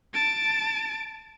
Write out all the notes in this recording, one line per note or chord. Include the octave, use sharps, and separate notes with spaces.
A5 D7